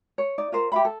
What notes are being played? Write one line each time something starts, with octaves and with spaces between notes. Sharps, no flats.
C#5
D#4 D5
F4 A#4 C5
G4 E5 F5 B5
A4